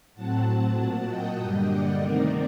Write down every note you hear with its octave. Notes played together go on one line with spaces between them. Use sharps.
A2 F#3 C4 F#5 A5
A#2 F#3 A#3 F#5 A5
D#5 G5
G2 D3 G3 A#3
D5 F#5
C3 D#3 A3 C4 D#4 A#4 D5